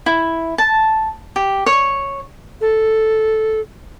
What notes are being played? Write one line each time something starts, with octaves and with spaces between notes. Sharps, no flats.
E4
A5
G4
C#5
A4